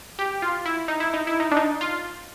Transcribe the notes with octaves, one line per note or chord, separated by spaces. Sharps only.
G4
F4
E4
D#4
E4
D#4
E4
D#4
D4
D#4
F4